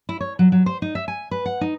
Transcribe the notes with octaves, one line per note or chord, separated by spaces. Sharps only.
E4
C#5
F#3
F#3
C5
D#4
E5
G#5
B4
F#5
D#4